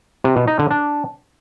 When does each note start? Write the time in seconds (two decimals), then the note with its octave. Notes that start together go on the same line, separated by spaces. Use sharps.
0.24 C3
0.36 B2
0.47 D#4
0.59 D3
0.71 D4